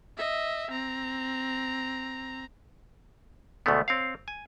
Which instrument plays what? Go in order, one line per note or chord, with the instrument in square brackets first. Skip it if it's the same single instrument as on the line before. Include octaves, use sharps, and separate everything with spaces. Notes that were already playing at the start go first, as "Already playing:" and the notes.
[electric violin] D#5 E5
C4 A#5
[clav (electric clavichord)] D2 B2 G#3 A3 B3
C4 C#5 F5
G#5